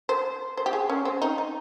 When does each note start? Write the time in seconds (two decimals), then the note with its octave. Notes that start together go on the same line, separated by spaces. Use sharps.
0.09 C5
0.57 C5
0.66 G4
0.73 G#4
0.89 C#4
1.05 C4
1.22 D#4
1.38 D#4